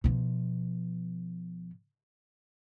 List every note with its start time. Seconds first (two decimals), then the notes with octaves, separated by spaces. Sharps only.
0.04 B2 F3